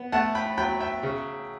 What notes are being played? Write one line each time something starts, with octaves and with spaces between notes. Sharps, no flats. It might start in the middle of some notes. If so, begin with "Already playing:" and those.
Already playing: B3
A3 F#5 A5
G5 B5
F#3 G5 B5
E5 G5
C#3